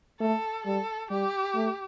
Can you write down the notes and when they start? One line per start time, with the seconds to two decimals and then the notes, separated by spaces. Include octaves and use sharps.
0.20 A3 A4
0.65 G3 A4
1.10 G3 G4
1.55 A3